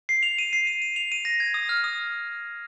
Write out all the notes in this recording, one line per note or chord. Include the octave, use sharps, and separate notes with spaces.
C7
F7
D#7
C7
D#7
D#7
F7
D#7
A#6
G#6
D#6
F6
D#6